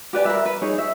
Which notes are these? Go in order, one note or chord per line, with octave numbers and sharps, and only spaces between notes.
G4 B4 D5 G#5
A#4 B4 E5
B4
D#4 G#4 C#5
E5